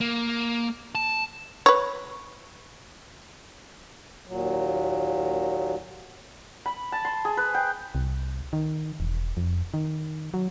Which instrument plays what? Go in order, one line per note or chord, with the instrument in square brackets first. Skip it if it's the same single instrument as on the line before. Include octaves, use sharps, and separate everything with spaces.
[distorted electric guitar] A#3
A5
[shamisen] B4 C#5
[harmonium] D#2 A#2 F#3
[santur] B5
A5
C6
G#4
B4
G5
[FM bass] C2
D#3
E1
F2
D#3
F#3